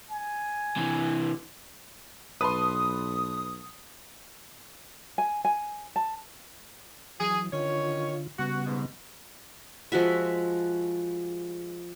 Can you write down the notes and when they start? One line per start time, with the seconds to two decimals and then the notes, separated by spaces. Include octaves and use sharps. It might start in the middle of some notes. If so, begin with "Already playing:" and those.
0.10 G#5
0.77 C3 E3
2.41 B1 B4 A5 C6 D#6
5.18 G#5
5.45 G#5
5.96 A5
7.20 E3 F#3 G#4
7.53 D3 D#3 C#4 F4 C#5
8.39 C#3 G3 B3 F#4
8.66 G#2 B2
9.92 F3 G#3 F#4 E5